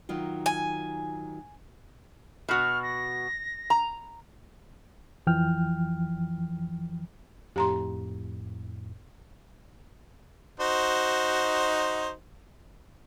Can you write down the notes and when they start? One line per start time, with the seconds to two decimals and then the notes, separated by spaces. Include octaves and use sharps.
0.09 D#3 F#3 F4
0.46 G#5
2.49 B2 F#4 F6
2.83 A#6
3.70 A#5
5.27 F2 E3 F3 G5 F6
7.56 F2 A2 G4 A#5 C6
10.60 D#4 F#4 C5